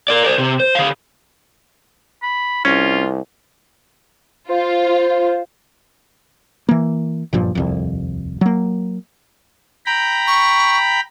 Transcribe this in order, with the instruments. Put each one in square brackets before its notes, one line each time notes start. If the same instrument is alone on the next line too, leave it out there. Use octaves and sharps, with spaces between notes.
[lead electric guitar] A#4 D5
C5 D5
C3
C5
D3 F5
[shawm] B5
[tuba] C2 [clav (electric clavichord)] C#4 [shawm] F4
[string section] F4 [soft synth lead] C5
[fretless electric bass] E3 A#3
F#1 G2 A#2 F3
D#1 C2 F2
F#3 A#3
[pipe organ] G5 A#5 B5
[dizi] C#6